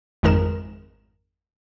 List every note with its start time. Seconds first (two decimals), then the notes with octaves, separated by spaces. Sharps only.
0.23 G#1 F2 D#3 G#3 A#4 E7